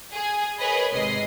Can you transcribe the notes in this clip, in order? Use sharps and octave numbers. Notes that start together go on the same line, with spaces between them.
G#4 G#5
G#4 A#4 B4 C#5 D#5 B5
G#1 C3 G#3 D#5 C7